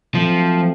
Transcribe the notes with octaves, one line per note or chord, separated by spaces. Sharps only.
F3 F#3 A3 C4